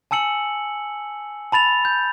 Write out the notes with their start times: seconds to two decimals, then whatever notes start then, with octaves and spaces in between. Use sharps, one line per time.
0.11 G#5 A5 E6 C#7 F#7
1.52 A5 B5 A6 F7
1.85 G6